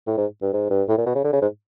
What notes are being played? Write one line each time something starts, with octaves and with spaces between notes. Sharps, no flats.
A2
G#2
G2
G#2
G2
A2
A#2
B2
C#3
D3
C#3
G#2